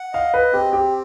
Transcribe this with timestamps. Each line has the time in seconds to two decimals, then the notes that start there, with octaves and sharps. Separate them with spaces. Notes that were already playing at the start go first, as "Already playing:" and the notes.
Already playing: F#5
0.13 D#5 F5
0.34 B4
0.53 C4 G4
0.73 G4